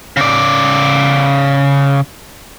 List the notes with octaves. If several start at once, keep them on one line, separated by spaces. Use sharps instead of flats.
C#3 D5